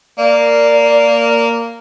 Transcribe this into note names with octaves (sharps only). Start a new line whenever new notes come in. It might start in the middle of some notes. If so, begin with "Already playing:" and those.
A#3 D5